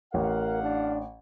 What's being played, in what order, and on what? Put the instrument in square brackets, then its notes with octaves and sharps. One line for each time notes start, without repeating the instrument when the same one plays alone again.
[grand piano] A1 [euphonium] A#4 [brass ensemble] F5 F#5
[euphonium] D4